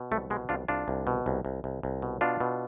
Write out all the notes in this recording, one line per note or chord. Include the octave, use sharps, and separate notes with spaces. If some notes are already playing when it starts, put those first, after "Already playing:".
Already playing: B2
C2 A3
B2 G#3
C2 D4 F4
C2 D4 F4
C2
B2
C2
C2
C2
C2
B2
B2 D4 F4
B2